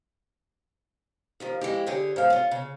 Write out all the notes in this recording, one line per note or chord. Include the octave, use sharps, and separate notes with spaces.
D#2 D#3 F3
F2 G#3 E4 G4
D3 G4 G#4 C#5
G#2 F5
C#4 F4
C#3